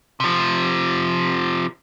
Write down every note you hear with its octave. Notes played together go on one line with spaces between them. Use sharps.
C3 F3